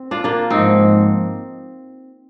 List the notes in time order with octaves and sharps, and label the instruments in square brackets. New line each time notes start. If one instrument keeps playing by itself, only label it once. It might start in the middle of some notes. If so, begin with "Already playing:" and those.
Already playing: [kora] C4
D4 F4
A#3 D4
[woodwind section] G#2 F3 G#3 [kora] C4 D#4